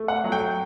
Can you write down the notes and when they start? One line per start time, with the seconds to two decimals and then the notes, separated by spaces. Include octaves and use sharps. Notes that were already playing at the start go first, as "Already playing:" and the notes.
Already playing: A3
0.08 F#5
0.24 F#3
0.32 G5